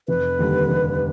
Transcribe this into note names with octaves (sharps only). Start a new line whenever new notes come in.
F1 B4
D#2 D3 G3
F1